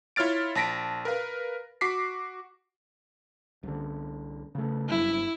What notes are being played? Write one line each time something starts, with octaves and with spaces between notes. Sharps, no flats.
E4 F4 C#5 F6 A6 D7
A#1 A5 A#6 B6 D7
A#4 B4 F5
F#4 D6 B6 C7
C2 D3
C#3 A3
F#1 G2 E4